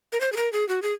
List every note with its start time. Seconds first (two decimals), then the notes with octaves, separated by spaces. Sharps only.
0.12 A#4
0.21 C5
0.32 G#4
0.37 A#4
0.53 G#4
0.69 F#4
0.82 G#4